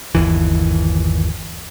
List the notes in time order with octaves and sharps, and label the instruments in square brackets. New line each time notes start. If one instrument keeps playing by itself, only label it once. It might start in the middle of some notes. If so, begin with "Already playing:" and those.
[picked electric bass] G1 D#2 E3